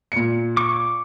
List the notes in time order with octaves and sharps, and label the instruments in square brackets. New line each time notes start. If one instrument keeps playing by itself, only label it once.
[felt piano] A#2 C#7
[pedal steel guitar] C#6 D6